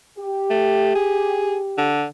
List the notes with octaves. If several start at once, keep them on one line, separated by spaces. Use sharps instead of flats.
G4
A3
G#4
D3